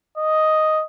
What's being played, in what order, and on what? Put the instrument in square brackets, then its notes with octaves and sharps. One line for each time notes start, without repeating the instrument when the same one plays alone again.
[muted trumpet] D#5